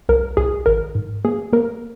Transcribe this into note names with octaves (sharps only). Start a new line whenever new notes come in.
C2 A#4
C2 G#4
G#1 A#4
G#2
A#3 G#4
A#3 A#4